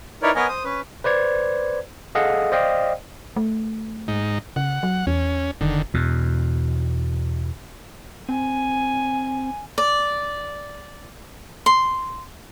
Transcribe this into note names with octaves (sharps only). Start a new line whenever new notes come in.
D#4 E4 A#4 B4 C#5 D5
B3 A#4 B4 C#5 D#5 G#5
C5 D#6
C#4 B4
B4 C5 D5 G#6
G#4 A4 D#5 F5 F#5
C5 D5 D#5 F5 G5
A3
G#2 D#4
C#3 F#5
F#3
E2 C#4
F1 D3 D#3
E2 B2
C4 G#5
D5
C6